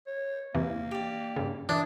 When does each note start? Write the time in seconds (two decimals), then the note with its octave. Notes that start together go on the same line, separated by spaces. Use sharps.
0.07 C#5
0.55 E2 C3 E3 A#3
0.91 G4 D5
1.36 G2 C#3
1.69 E3 D4 E4 D6 D#6